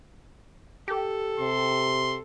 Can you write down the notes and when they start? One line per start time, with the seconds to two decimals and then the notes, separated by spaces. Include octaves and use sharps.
0.88 G4 A4
1.40 C3 C6